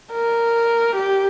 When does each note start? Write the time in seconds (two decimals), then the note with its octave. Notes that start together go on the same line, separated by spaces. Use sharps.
0.12 A#4
0.97 G4